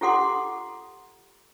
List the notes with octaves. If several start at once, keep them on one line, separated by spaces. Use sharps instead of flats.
F4 G4 A4 F#5 C6 D6